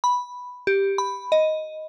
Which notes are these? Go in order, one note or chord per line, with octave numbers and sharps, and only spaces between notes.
B5
G4
B5
D#5